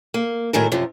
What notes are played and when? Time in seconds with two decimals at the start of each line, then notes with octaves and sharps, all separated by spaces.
0.14 A#3
0.53 A2 D#3 F#3 A3 G#4 A#4
0.72 F#2 C3 F3